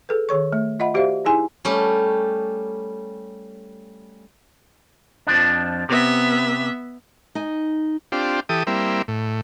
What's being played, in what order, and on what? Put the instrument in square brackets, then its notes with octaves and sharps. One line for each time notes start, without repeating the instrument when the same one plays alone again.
[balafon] G#4 A4 B4
D#3 G#4 C#5 C#6
A3
F4 D#5 E5 F#5 B5
F#4 G4 C5 D5 E5 F5
D#4 E4 G#4 G#5 C6
[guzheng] G3 A3 C#4 G4
[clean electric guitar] F2 F3 D4
[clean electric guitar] C3 [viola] B3 E5
[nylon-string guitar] D#4 G#5
[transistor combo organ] C4 D4 F4 G4
E3 G4 A4 D#6
G3 A#3 C4 E4
A2